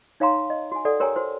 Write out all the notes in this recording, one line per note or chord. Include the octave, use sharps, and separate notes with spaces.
D#4 C#5 F5 G5 A#5 C6
D#5
F#4 G#5
A4 D5 F#5
G4 A#4 C#5 G5 G#5 A#5
F#4 C5